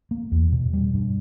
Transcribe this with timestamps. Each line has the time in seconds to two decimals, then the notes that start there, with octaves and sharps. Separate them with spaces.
0.11 A#3
0.32 E2
0.52 B2
0.73 G3
0.94 G2